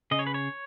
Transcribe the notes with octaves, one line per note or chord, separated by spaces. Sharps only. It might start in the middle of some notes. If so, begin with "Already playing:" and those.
C#3 D#5
C#5
B4
C#5